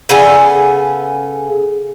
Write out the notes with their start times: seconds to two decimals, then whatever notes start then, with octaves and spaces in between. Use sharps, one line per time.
0.09 C#3 B3 A4 G#5